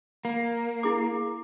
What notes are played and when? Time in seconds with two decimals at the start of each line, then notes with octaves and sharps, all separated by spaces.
0.25 A#3
0.83 E4 G#4 D6